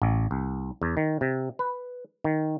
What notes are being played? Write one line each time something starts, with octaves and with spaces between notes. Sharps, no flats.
A1
C2
E2
D#3
C3
B4
D#3